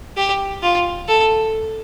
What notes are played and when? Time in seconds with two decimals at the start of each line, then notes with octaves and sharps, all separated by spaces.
0.17 G4
0.63 F4
1.08 A4